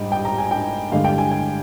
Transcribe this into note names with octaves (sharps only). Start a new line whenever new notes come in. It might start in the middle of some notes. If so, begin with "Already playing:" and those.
Already playing: G#2 G3 D4 D#5 G5
G5
A#5
G#5
G5
G2 D3 G#3 D4 F5
G5
G#5
G#5